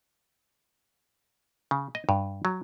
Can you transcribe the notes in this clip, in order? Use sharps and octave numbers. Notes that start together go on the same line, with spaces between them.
C#3
D#5
G2
F#3